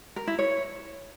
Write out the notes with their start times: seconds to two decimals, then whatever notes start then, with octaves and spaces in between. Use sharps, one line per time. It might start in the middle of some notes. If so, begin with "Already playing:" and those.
0.16 A#4
0.27 E4
0.39 C#5